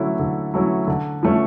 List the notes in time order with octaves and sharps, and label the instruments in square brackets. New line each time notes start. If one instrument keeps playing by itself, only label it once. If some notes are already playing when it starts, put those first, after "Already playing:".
Already playing: [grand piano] D3 F#3 A3 C#4 E4
D3
F#3 A3 C#4 E4
D3
F3 A3 C#4